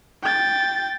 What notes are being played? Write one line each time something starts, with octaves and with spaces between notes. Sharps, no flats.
G5 A6